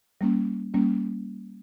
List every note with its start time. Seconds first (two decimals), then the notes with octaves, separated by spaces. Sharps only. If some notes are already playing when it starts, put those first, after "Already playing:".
0.21 G3 A#3 C#4
0.74 G3 A#3 C#4